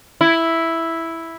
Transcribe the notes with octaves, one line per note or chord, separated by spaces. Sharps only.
E4